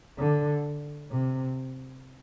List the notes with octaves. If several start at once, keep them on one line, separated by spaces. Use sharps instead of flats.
D3
C3